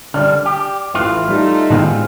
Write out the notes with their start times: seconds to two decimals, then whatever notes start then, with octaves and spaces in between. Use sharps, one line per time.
0.14 D3 G3 D5 F6
0.46 G4
0.95 A1 A2 E3 F4 F#6
1.28 G3 A3 D#4
1.70 A2 D#3 G#3 B3 C4 F4